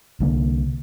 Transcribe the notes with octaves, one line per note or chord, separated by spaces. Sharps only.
C2 D3 A#3